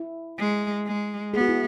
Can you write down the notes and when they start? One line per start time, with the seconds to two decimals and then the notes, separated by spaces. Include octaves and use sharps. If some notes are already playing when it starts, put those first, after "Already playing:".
Already playing: E4
0.39 G#3
0.86 G#3
1.34 B3 G#4
1.41 F#4
1.49 E4